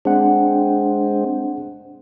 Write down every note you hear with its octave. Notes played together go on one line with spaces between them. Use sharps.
G#3 C4 D4 F#5